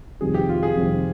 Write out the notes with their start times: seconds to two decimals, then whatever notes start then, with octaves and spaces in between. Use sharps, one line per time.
0.21 F2 C3 D#3 G3 C4 G#4
0.34 G4
0.49 F4
0.63 G#4
0.77 F2 C3 D#3 G3 C4